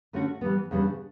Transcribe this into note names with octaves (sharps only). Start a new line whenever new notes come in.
D3 A3 C#4 F#4
E3 G3 B3
E2 C#3 G3 B3 D4